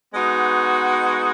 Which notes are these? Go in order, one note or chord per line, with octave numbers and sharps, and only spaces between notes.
G#3 B3 D#4 F#4